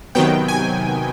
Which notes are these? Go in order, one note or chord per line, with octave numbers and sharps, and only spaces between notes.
C3 D#3 F#3 B3 G5
G#5